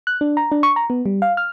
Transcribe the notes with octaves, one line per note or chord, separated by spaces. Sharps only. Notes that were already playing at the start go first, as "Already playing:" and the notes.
F#6
D4
A#5
D4
C#6
A#5
B3
G3
F5
F6